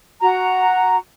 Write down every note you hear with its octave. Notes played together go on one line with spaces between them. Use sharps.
F#4 A#5